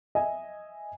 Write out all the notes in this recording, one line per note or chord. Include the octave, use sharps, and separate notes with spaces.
D#5 E5 G#5